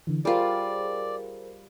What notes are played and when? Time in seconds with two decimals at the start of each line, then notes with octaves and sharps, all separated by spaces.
0.07 D3 E3
0.25 G3 F4 G#4 A#4 C5 D5